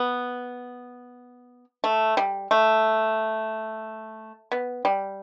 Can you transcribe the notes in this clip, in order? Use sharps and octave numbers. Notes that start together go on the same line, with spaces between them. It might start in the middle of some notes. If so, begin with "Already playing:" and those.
Already playing: B3
A3
G3
A3
B3
G3